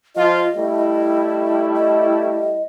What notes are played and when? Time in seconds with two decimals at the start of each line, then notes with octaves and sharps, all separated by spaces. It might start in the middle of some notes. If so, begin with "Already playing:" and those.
0.16 F3 F4 D#5
0.55 G3 A3 E4
1.75 D#5